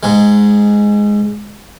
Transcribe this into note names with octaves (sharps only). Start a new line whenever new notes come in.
G#2 G#3